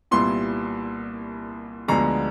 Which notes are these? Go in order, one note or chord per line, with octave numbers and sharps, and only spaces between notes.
C2 A#2 G3 B3 E4 C6
D2 D3 F3 G#3 B3 A#5